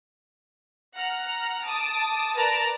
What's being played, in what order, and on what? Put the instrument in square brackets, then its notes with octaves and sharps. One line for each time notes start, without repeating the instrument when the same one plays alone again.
[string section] F#5 A#5 F6
A5 D6 D#6
A#4 B4 D5 A5 A#5